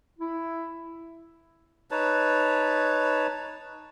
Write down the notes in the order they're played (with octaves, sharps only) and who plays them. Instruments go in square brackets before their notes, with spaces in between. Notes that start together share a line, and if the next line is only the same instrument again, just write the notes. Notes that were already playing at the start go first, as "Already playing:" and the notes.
[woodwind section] E4
[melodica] D#4 B4 C#5 A5